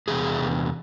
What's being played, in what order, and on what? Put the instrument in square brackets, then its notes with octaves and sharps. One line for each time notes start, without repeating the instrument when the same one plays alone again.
[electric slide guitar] E2 C3 B3 G#4